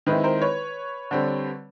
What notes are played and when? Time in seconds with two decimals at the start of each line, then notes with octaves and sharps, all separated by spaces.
0.06 D#3 G#3 C4 E4 B4
0.24 A#4 C5
0.42 B4 C#5
1.11 D3 G3 C4